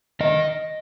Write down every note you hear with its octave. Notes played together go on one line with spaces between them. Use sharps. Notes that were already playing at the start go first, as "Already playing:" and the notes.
D#3 D#5